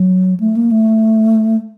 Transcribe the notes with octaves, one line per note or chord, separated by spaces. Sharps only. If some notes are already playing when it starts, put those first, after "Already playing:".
Already playing: F#3
A3
A#3
A3